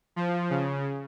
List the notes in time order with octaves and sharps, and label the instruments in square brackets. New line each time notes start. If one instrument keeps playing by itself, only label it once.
[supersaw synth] F3
C#3